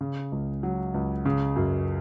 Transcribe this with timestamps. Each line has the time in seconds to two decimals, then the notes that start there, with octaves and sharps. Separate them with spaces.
0.01 C#3
0.32 C#2
0.63 F#3
0.94 C#2
1.25 C#3
1.56 F#2